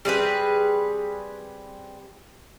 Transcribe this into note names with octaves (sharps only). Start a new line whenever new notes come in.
G3 C4 G#4 B4